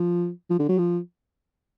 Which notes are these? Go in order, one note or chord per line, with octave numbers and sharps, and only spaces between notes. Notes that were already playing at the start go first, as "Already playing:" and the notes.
Already playing: F3
F3
D3
F#3
F3